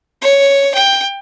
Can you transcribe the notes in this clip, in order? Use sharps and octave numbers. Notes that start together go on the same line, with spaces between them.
C#5
G5